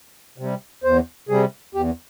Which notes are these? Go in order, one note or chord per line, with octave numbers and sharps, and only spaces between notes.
C3 G3
E2 C5
C3 G3 G#4
E2 G4